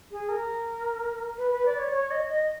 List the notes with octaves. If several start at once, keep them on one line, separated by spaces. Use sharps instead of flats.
G#4
A#4
B4
B4
D5
C#5
C#5
D#5
D#5